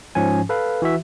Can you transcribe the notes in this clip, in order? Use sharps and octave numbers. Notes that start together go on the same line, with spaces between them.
G#2 F3 C#4 G#5
A4 B4 F5
E3 F#4 E5